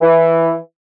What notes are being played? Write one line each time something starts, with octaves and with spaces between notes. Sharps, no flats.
E3